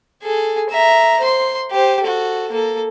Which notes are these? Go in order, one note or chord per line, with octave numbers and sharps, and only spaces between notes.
G#4 A4
E5 A#5
C5 C6
G4 C5
F#4 A4
A#3 A4